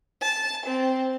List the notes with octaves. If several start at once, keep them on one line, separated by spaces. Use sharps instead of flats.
A5
C4